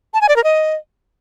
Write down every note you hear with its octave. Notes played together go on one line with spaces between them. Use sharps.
A5
G#5
D5
A#4
D#5